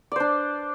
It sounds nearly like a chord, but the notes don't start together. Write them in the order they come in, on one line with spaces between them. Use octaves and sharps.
D5 C5 D4